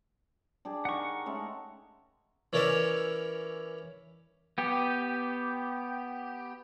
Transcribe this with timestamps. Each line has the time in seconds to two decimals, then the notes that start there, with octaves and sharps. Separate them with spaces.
0.65 D4 G4 G#4
0.85 D#4 A#4 F#5 C#6
1.26 G#3 A3 C#4
2.53 E3 C#4 A#4 C#5 D5 E5
4.58 B3 G4